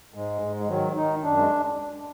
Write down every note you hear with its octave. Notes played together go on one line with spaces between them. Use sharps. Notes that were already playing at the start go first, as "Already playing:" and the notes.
G#2 G#3
G#2
G#3
D#3 F#3
D#3 D#4
F#2 D4
G#3